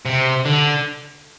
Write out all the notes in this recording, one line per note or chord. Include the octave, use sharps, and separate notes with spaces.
C3
D3